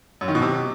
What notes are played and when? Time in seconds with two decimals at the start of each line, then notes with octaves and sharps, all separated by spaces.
0.21 F#2
0.28 D#3
0.35 B2
0.42 C3